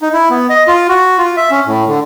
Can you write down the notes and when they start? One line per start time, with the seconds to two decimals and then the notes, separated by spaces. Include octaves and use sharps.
0.02 D#4
0.13 E4
0.30 B3
0.50 D#5
0.67 F4
0.89 F#4
1.18 F4
1.37 E5
1.50 C#4
1.66 A2
1.87 D3